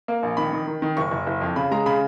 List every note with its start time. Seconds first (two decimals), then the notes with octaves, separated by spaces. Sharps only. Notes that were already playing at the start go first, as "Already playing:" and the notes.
0.08 A#3
0.23 A#1
0.37 D#3 B5
0.53 D#3
0.67 D#3
0.82 D#3
0.97 F#1 C#6
1.11 F#1
1.27 F#1
1.41 F2
1.56 C#3 B5
1.71 G#3 A#5
1.86 C#3 B5